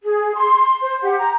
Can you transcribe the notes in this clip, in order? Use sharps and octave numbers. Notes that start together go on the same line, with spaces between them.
G#4
C6
C5
G4 F#5
A#5